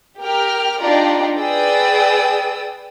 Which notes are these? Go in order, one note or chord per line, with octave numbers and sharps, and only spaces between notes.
G4 A#4 G5 F6
D4 D#4 F4 G4 D5 A#5
G#4 B4 D5 G5 D#6 E6